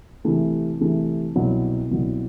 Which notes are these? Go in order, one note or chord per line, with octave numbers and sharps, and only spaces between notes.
C3 E3 A3
C3 E3 A3
C2 B2 F#3
C2 B2 F#3